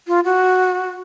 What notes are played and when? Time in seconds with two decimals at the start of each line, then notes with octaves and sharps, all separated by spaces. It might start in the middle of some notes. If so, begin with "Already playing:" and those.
0.07 F4
0.25 F#4